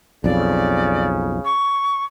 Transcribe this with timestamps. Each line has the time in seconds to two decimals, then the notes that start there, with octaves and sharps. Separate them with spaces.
0.24 B1 F2 C#3 D5
1.45 C#6